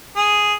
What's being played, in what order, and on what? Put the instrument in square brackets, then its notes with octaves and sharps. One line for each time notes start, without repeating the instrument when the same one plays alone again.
[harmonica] G#4